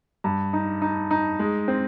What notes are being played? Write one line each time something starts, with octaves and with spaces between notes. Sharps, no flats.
G2
D#4
D#4
D#4
G#3
C4